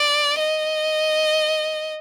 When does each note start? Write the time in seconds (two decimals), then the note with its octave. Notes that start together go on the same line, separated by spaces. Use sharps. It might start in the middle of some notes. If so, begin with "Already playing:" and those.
Already playing: D5
0.39 D#5